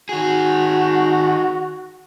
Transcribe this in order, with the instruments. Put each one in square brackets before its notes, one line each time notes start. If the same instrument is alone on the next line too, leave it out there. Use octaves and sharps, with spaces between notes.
[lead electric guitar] D#3 G#4 [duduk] F#4